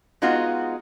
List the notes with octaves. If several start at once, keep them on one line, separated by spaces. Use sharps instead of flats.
G#3 B3 D#4 F4 F#4